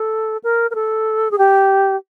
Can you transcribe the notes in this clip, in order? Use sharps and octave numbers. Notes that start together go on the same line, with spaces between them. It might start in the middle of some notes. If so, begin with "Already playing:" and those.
Already playing: A4
A#4
A#4
A4
G#4
G4